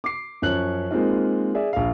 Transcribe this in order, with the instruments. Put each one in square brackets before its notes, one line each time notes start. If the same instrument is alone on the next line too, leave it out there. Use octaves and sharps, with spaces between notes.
[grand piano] D6 C7
F#2 F3 C#4 C#5 F#6 F#7
G#3 A#3 C4 D#4 F4
G#4 D5 E5
A#1 F5